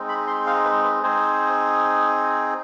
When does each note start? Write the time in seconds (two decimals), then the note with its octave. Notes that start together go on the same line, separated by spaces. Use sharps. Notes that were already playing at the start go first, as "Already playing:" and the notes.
Already playing: G#3 C4 D#4
0.09 B5
0.27 C6
0.47 F5
0.65 B4
0.85 B4
1.02 C4 D#4 G#4 C5